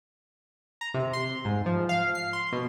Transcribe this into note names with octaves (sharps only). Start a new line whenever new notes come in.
A#5
C3
C6
G#2
F3
F5
C7
C6
B2